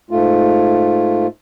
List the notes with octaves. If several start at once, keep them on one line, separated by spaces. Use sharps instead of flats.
G#2 A3 F4